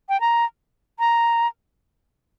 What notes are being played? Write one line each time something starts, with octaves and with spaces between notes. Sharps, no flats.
G5
A#5
A#5